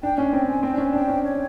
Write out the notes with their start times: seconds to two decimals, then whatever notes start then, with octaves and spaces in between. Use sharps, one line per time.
0.03 D4 G5
0.18 C#4 G#5
0.33 C4 G5
0.48 G#5
0.63 C4 G5
0.74 D4
0.78 C#4 G#5
0.92 D4 G5
1.07 C#4
1.23 C#5